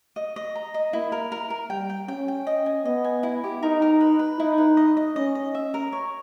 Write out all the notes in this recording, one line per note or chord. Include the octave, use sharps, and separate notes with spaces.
D#5
D#5
A#5
D#5
A#3 E4
A#4
A#4
A#4
G3 G5
G5
C#4 G5
G5
D#5
G#5
B3 D#5
G#5
E4
G4
D#4 A#4
A#4
B4
B4
D#4 E4
B4
D#5
D#5
C#4 D#5
D#5
E5
A#4
C#5